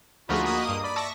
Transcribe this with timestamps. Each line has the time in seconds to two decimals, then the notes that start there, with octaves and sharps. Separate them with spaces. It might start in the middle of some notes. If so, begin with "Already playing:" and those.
0.29 D2 F3 A3 D#4 F4 F#4 G#4 B5
0.44 A#3 D#5 D#6
0.69 G2
0.84 D5 B5
0.96 E5 A5 C#6 D6 A#6